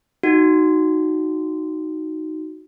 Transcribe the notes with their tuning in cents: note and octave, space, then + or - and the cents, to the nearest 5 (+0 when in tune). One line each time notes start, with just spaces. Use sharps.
D#4 +0 F#4 +0